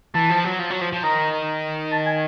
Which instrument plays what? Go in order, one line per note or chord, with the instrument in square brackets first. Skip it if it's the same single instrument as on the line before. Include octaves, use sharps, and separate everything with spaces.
[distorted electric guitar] E3 [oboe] A5
[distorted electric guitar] F3
F#3
F3
F#3
F3
F3
[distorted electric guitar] D#3 [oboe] A#5
[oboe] A5
G#5